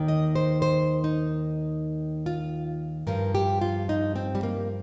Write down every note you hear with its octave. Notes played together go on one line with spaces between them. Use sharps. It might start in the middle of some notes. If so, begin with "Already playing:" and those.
Already playing: D#2 D#3
D#5
C5
C5
D#4
F4
G2 F3 A#4
G4
F4
D#4
C4
G3
A#3